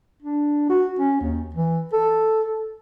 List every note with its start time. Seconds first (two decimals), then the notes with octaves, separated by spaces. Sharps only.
0.22 D4
0.70 F#4
0.99 C#4
1.21 D#2
1.55 E3
1.93 A4